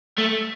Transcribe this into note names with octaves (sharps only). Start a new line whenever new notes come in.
A3